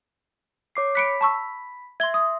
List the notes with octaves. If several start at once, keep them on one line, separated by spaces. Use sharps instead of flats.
C#5 D6 C7
B5 F#6 B6 C#7 D7
A5 C#6 E6
E5 C6 G#6 G7
D#6